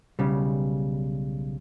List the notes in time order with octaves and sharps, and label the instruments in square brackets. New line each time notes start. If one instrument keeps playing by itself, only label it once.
[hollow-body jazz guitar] B1 C#3 G3